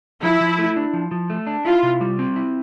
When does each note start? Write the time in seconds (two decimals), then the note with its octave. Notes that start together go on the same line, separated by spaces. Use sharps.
0.23 F3 E4
0.40 F3
0.58 A3
0.76 D4
0.93 F3
1.11 F3
1.30 A3
1.47 D4
1.65 E4 F4
1.83 C3
2.01 G3
2.19 C4
2.36 E4